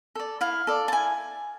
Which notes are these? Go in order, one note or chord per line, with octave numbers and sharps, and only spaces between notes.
A4 D5
E4 F5
A4 D5
A5
E4 G#5